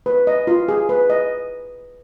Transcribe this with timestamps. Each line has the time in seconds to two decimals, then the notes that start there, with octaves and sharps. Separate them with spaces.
0.06 B4
0.27 D#5
0.47 F4
0.68 G#4
0.89 B4
1.10 D#5